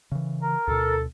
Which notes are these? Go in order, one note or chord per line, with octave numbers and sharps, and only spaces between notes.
C#3 E3
A#4
D2 B2 A4